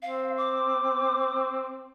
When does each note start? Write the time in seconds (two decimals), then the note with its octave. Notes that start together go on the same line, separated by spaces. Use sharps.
0.02 C4 F5
0.37 D6